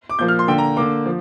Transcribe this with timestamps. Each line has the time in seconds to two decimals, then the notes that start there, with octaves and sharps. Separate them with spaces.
0.10 D6
0.19 A#2 F3 A#3 G6
0.28 F6
0.39 C6
0.48 D3 A#3 G5
0.58 A#5
0.77 D3 A#3 D6
1.06 F3